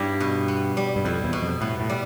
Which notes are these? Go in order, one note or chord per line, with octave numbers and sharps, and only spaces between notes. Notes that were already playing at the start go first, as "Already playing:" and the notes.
Already playing: G2 G3 B3 E4
B2
B3
G3
G2
F2 E4
E2
B2
F2
A2 B3
A2
G3